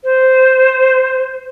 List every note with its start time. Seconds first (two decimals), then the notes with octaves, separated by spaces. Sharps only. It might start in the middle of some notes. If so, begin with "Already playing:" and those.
0.04 C5